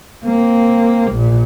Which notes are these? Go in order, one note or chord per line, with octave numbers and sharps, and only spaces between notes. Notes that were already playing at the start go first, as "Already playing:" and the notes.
A#3 C4
A#1 A#2